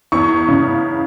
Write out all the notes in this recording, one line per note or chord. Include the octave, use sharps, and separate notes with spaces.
E2 C#6
C#3